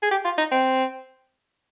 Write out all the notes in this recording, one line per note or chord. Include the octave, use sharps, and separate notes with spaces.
G#4
G4
F4
D#4
C4